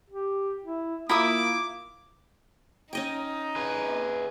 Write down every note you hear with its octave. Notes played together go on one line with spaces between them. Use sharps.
G4
E4
A#3 E4 F4 E5 A#5 B5 D6 D#6
C#4 D#4 D#5 G5
G#4 B4